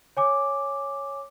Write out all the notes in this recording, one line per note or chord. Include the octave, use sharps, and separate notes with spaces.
C#5 G#5 D6